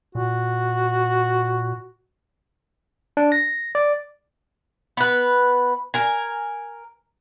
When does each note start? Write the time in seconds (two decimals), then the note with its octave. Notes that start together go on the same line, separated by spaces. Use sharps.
0.15 A#2 F#4
3.17 D4
3.32 A#6
3.75 D5
4.97 B3 B4
5.94 A#4 G#5